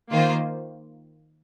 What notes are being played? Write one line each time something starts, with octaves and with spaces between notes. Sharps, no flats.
D#3 A#3 F4 C5